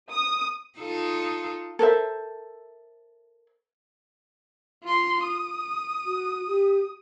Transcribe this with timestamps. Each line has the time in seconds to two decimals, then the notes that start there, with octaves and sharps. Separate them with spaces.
0.12 D#6
0.79 D#4 F4 A4
1.79 A4 A#4 C5 E5
4.83 F4 C6
5.24 D#6
6.05 F#4
6.47 G4